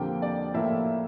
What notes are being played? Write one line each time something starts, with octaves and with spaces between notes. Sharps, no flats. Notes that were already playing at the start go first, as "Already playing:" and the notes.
Already playing: F2 D3 F3 A#3 G4 G5
D5
A2 F3 A#3 E4 E5